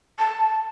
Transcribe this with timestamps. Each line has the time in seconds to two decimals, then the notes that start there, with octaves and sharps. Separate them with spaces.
0.19 A5